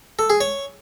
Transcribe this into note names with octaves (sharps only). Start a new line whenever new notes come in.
A4
G#4
C#5